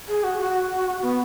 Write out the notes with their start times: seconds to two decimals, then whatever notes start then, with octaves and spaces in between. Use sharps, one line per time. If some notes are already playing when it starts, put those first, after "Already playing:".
0.08 G#4
0.24 F#4
0.40 F#4
1.02 B3